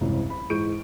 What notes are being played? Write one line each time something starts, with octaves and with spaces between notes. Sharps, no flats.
F#1 C2 G#2 C#3 E3
B5
G#2 E3 G#4 C#6 G6 D7